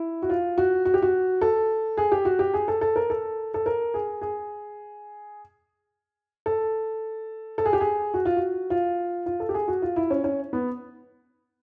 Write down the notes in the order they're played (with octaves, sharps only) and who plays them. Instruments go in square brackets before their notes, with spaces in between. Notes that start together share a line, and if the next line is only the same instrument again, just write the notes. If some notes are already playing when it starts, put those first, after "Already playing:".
Already playing: [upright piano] E4
F#4
F4
F#4
F#4
G4
F#4
A4
G#4
G4
F#4
G4
G#4
A4
A4
A#4
A4
A4
A#4
G#4
G#4
A4
A4
G#4
G4
G#4
F#4
F4
F#4
F4
F4
A4
G4
G#4
F#4
F4
E4
C#4
C#4
B3